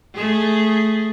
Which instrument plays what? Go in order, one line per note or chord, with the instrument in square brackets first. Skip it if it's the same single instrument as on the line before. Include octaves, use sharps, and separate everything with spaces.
[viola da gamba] A3 G#4